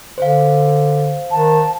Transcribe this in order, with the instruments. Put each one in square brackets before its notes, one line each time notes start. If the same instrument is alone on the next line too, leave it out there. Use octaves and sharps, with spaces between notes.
[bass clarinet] D3 [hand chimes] C5 F5
[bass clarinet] D#3 [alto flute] A5